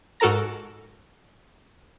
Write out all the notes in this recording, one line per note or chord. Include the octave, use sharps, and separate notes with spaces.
G#2 F#4 A4 A#4 A#5 A#6